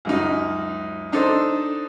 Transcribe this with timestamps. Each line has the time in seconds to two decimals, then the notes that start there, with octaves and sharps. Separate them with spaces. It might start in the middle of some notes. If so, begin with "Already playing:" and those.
0.05 C#2 F#2 D#4
1.12 D4 D#4 A4 C5